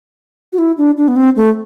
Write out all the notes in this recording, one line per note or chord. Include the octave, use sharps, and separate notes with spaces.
F#4
E4
D4
D4
B3
C4
A3